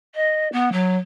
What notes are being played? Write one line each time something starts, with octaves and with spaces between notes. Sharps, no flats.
D#5
B3
F#3